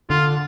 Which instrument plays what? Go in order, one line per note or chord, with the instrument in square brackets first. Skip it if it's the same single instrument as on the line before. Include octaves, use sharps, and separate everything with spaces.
[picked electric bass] D3 [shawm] F4